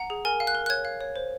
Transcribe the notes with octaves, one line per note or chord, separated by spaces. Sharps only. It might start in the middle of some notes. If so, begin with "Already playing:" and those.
Already playing: F#5 A#5
G#4
A#4 G#5
F5
F#6
A#4
F#6
C#5 G#6
F5
C#5
C5